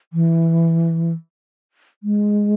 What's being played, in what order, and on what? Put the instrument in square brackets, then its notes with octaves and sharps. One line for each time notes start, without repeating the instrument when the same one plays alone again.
[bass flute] E3
G#3